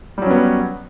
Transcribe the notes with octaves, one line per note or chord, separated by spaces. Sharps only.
F#3 G3 B3 C#4